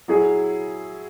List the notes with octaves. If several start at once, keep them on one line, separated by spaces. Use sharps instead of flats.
F#3 E4 G#4